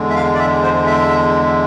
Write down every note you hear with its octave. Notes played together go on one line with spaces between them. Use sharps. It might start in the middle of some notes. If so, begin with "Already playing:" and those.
Already playing: E2 D3 G#3
E5
F5
D5
E5
C5
E5